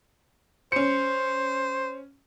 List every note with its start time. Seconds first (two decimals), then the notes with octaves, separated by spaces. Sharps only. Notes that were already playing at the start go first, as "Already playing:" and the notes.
0.72 C#4 C5 C#7